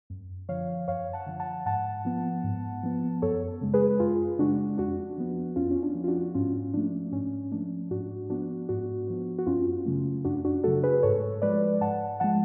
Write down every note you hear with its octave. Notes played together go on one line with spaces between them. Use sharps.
F#2
D3 F3 C#5 F5
F#2 C#5 F5
F#5 A5
D3 F3
F#5 A5
G#2 F#5 A5
F3 B3
G#2
F3 B3
F#2 A4 C#5
C#3 G#3
G#4 B4
F#2 F4 G#4
C#3 G#3 D4 F#4
F2 D4 F#4
F3 B3
F2 C#4 F4
C#4
D4
F3 B3
F4
D4 F#4
G#2 C#4 F4
F3 A3 D4
G#2 C#4
F3 A3 D4
G#2 D4 F#4
F3 B3 D4 F#4
G#2 D4 F#4
F3 B3
F#4
F#2 C#4 F4
C#3 F#3 A3
F#2 D4 F#4
D4 F#4
C#3 F#3 A3 F#4 A4
G#4 B4
G#2 A4 C#5
F3 G#3 B4 D5
G#2 F#5 A5
F3 G#3 F#5 A5